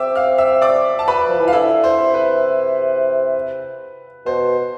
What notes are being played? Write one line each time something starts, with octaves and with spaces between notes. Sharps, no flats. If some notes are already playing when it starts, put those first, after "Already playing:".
Already playing: C4 E5 D6 E6
F5 F6
E5 E6
D5 D6
A5
B4 B5
F3
E3
F5
D3 E4 E5
C5
C3
B4
B2 C5